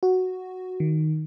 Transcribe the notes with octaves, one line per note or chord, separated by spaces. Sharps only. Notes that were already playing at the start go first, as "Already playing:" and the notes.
F#4
D#3